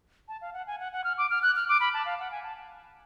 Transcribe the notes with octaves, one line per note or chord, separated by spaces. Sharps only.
A5
F5
F#5
G#5
F#5
F#5
F6
D6
F6
F#6
F6
D6
B5
A5
F5
F#5
G#5
A5